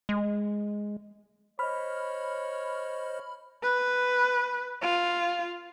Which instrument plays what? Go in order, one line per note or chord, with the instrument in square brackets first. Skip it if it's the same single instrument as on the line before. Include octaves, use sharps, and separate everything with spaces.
[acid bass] G#3
[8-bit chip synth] C5 D#5 [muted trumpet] C#5 [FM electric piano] B5 F6
[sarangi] B4
F4